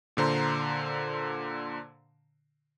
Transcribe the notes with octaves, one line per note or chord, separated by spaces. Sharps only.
A#2 D3 C5 A#5 C6